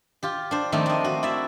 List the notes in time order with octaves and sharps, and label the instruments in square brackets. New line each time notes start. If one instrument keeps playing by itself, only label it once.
[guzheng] F4 G4
D4 C5
D#3 F3 A3 A#3 C4 D4
D4 D#5
F#4
E4 D5 E5